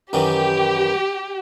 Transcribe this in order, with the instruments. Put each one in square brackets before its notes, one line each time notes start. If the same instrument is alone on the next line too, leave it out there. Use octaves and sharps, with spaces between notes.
[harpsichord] F#2 D#3 E3 [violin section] G4